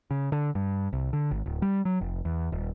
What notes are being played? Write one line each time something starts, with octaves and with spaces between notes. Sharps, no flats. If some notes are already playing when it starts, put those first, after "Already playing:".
C#3
D3
G2
C2
D3
G#1
D1
G3
F#3
F1
E2
D#1